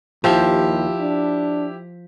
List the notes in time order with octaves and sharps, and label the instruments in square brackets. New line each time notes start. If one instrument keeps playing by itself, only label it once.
[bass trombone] D#2 [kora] F3 [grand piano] E4 G4
[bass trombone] D4